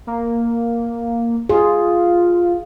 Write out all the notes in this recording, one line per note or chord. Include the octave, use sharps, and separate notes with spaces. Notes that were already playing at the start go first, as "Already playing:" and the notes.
A#3
F4 G#4